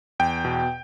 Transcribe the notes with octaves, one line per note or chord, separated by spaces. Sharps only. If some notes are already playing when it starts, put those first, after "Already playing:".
E2 G5
B2